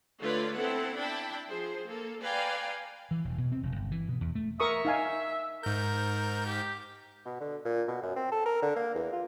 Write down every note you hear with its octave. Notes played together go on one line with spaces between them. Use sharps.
D3 A3 F4 B4 C#5 D5
B3 C4 E4 A4 F#5
D4 E4 G5 A5 B5
F3 G#4 C5
A#3 A4
B4 D5 F5 G5 G#5 A#5
E3
E1
B2
C4
F1
G1
E3
B2
E2
A3
A#4 E5 C#6 D#6
D#4 F5 G#5
G#2 A#4 G6
G4
B2
D3
A#2
B2
F#2
C4
A4
A#4
D3
A#3
E2
F4